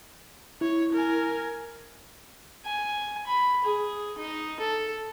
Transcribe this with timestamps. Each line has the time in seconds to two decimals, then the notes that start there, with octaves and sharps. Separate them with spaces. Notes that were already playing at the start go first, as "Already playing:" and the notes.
0.61 E4 C#5
0.93 A#4 G#5
2.66 G#5
3.27 B5
3.64 G#4
4.18 D#4
4.60 A4